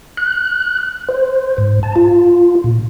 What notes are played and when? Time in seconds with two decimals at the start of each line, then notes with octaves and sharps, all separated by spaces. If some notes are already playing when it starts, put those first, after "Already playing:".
0.17 F#6
1.09 C5
1.58 G#2
1.83 A5
1.96 F4
2.64 A#2